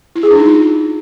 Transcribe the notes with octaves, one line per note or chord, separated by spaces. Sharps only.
E4
G#4
D4
D#4
F4